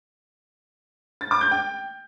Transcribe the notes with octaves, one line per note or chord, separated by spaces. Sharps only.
A6
D6
G6
G5